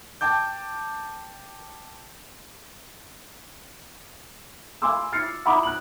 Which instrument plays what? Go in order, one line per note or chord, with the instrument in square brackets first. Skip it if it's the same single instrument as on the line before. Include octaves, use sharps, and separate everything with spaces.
[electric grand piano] G5 A5 D6 G6
[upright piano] F5 G#5 B5 C6 D6 E6
F6 A6 C7 C#7
E5 F#5 A#5 B5 D6 D#6
F#6 F#7